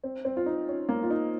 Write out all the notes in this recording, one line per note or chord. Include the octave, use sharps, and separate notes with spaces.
C4
C4
F4
D#4
C#4
A#3
F4
D#4